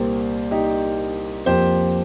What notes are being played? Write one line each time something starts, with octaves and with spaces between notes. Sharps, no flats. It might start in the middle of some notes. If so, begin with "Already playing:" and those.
Already playing: C2 A#2 A#3 G4 C5
D#4 G4
F2 F3 A#3 G4 C5